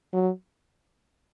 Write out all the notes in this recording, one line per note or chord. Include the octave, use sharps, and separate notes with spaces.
F#3